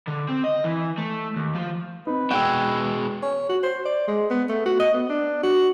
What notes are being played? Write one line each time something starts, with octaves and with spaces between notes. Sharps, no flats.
D3
C4
D#5
E3
A3
D#2
F3
C4 D#4 B4
B2 G#3 G5 E6 F#6
C#5
F#4
C5
D5
G#3
B3
A3
F#4
D#5
B3
D4
F#4